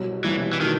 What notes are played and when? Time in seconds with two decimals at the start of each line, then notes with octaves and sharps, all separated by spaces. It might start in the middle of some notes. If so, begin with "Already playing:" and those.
Already playing: C2 B2 F#3
0.24 C2 B2 E3 F#3
0.53 E3
0.61 B2 D#3 A3